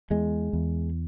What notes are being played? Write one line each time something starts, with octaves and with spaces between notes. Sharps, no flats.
E2 G#3
E2